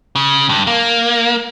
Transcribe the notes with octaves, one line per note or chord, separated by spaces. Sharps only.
C#3
G2
A#3